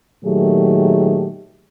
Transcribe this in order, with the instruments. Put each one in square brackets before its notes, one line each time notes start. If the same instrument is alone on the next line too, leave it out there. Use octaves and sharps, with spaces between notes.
[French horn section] A#2 D#3 F#3 A3 G4 G#4